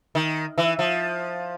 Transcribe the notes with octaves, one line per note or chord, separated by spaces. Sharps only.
D#3
E3
F3